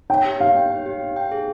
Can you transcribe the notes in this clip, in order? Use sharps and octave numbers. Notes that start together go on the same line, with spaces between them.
C#5 G5
G4
G4 F5
G5
C#5
G4
G4
G5
G#4